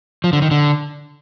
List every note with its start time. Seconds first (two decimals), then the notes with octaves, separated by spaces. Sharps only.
0.24 F3
0.33 D3
0.42 D#3
0.51 D3